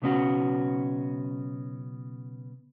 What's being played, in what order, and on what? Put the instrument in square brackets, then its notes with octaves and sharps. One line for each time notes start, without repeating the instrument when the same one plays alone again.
[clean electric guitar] B1 C#3 B3 C#4 F#4